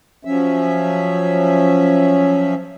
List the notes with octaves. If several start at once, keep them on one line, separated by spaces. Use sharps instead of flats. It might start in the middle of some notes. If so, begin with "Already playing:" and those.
F3 F#3 C#4 E5